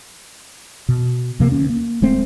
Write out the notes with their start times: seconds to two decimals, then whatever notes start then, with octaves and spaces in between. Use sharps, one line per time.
0.89 B2
1.39 D2 C3 F3 A#3
1.51 D2 C#4
1.69 A#3
2.02 D1 G#3 A3 C4